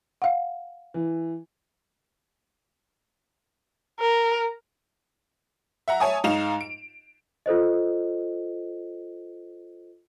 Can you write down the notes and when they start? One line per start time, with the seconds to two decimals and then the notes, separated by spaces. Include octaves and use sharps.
0.22 F5 F#5
0.94 E3
4.01 A#4
5.88 E5 F#5 A#5
6.00 C#5 E5 G#5 A5 D#6
6.24 G#2 D#4 F5 E7 F7
6.61 D7
7.46 F4 A4 C5 D#5